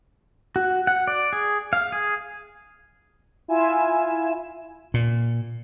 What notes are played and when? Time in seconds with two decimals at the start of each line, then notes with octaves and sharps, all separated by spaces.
0.56 F#4
0.87 F#5
1.08 D5
1.33 G#4
1.73 F5
1.92 G#4
3.48 E4 F4 G#5 E7
4.94 A#2